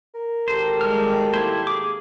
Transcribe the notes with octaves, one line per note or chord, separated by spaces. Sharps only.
A#4
G#1 G4 A4 C5
G3 G#3 F6
G3 A#3 E4 C5
G#4 D6